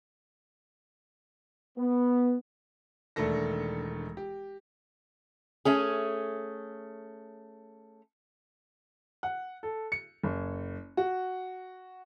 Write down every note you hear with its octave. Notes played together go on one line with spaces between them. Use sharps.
B3
E1 D#3 A3 D4 A4 A#6
G4
A3 C#4 G#4
F#5
A4
C#7
F#1
F#4